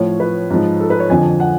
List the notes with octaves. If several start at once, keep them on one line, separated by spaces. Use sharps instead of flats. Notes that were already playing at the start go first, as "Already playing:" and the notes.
Already playing: A2 F3 C#5
B4
G#2 F3
A4
B4
C#5
F2 D3 F3 G#5
F#5